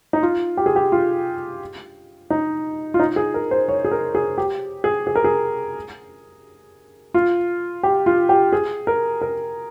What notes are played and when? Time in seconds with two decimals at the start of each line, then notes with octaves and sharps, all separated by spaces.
0.13 D#4
0.23 F4
0.57 G4
0.66 G#4
0.76 G4
0.92 F4
2.30 D#4
2.94 F4
3.00 D#4
3.16 G#4
3.34 A#4
3.51 C5
3.68 C#5
3.85 G#4
3.91 A#4
4.15 G#4
4.38 G4
4.84 G#4
5.07 G#4
5.16 A#4
5.24 G#4
7.14 F4
7.83 G4
8.06 F4
8.29 G4
8.53 G#4
8.87 A#4
9.22 A#4